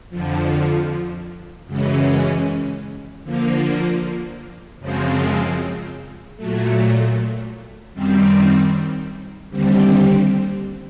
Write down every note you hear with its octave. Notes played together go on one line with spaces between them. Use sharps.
F2 D3 F3
F#2 C#3 E3 G#3 C#4
D3 F3 A#3
F#2 C#3 F3 G#3 C4
A#2 F#3 A3
F#2 D#3 G3 C4
D#2 D3 G3 C4